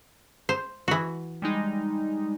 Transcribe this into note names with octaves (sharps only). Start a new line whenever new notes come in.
C5
E3 F#4
G3 G#3 D#4